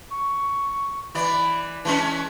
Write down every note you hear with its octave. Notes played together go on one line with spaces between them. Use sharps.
C#6
E3 D5 B5
E3 G#3 C#4 A5